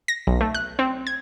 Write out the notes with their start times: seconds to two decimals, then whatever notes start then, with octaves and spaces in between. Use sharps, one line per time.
0.08 A#6
0.27 B1
0.41 A3
0.54 F#6
0.79 C4
1.07 G#6